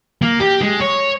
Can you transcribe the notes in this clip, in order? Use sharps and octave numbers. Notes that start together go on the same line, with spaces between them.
A#3
G4
G#3
C#5